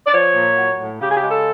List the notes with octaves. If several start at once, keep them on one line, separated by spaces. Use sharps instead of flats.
D5
F3 C#5
A#2
F#3
A2
C#3 G4
G#4
G4
G#3
A4